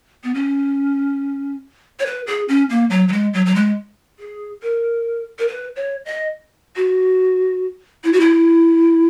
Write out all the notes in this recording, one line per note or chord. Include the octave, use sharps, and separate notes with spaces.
B3
C#4
C#5
B4
G#4
C#4
A#3
F#3
F#3
G#3
F#3
F#3
G#3
G#4
A#4
A#4
B4
C#5
D#5
F#4
E4
F#4
E4